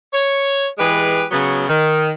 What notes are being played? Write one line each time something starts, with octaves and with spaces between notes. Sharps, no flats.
C#5
E3 G#3 G4 G#4 B4
C#3 F#3 B3
D#3